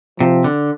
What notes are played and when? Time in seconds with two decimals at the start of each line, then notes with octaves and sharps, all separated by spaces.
0.20 C3 F3
0.44 D3